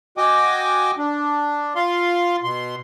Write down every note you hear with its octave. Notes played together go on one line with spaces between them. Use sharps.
F#4 D#5 G5 G#5 D6
D4
F4 F5 C6
B2 C6